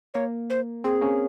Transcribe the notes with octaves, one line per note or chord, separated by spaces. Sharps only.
A#3 C#5
C5
C4 G#4
A#3 C#4